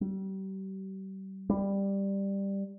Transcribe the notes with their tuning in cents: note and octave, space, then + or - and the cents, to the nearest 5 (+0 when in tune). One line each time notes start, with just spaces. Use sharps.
G3 -35
G3 +10